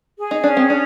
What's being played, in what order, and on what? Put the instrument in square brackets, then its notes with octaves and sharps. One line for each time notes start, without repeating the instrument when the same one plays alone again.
[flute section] G#4
[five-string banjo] D#4
[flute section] C#4 [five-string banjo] D4
[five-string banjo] C4
[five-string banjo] D4 [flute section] D5